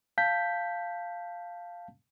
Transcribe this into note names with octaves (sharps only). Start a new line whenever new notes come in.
F5 A5 G6 B6